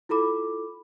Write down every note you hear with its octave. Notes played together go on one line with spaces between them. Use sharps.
E4 F4 A4 B5 D6